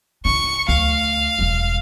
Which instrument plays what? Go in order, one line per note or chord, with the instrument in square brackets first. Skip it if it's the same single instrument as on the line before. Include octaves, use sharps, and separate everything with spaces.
[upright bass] C#2 D4 [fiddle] C#6
[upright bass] D2 [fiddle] F5
[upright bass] E1 G3